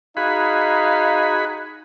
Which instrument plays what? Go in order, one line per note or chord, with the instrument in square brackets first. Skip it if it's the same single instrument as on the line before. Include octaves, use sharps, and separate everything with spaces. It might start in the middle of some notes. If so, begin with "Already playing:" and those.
[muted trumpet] D#4 [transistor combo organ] F#4 G#4 B5 [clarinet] F5